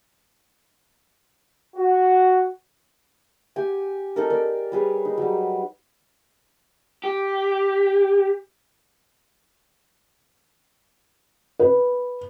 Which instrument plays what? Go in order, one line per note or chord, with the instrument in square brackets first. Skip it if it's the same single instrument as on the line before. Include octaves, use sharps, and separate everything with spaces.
[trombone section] F#4
[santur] G4 G#5
C#4 D#4 A4 A#4
A#4 D5
G3 G#4 B4 C#5
D#4
F#3 G3
[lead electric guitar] G4
[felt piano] B4